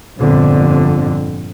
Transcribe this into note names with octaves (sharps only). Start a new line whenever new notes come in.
G1 F2 A#2 D3